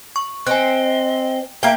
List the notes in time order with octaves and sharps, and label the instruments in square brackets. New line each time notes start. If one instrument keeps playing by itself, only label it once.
[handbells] C#6
[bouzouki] C4 [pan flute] D#5 [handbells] G#5 F#6
[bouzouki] A#3 G5 [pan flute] E5